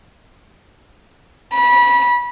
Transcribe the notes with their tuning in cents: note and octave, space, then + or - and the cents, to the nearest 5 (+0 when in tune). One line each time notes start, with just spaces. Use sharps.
B5 -25